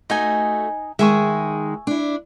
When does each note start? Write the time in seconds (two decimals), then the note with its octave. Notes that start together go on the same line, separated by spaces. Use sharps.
0.10 A3 D#4 F#4 D#5 G#5
0.99 D#3 G#3 E5 G#5 C#6
1.87 D4 E4